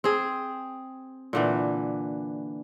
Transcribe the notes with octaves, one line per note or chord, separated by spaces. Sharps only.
C4 G#4
A#2 D3 E3